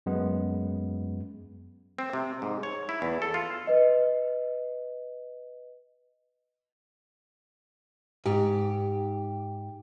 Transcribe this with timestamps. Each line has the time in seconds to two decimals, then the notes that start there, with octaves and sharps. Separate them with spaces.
0.06 F#2 G#3 B3
1.98 C4
2.13 C3
2.42 G#2
2.63 C#5
2.89 E4
3.02 E2
3.22 A4
3.34 F4
3.67 B4 D#5
8.26 G#2 G4